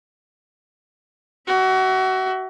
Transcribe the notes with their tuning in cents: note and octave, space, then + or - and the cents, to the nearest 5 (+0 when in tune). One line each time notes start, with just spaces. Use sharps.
F#4 +30 E5 +0